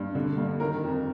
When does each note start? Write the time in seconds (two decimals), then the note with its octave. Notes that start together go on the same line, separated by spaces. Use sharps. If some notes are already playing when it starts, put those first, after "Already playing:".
Already playing: G2
0.15 D3
0.38 G2
0.60 D#3 A#4
0.84 F2